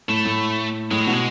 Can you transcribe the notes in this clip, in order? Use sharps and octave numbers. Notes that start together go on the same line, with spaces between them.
A2 A3
A2
A2 G#3
F#3
B2
G#3